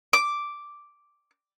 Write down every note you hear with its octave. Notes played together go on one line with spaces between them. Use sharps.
D6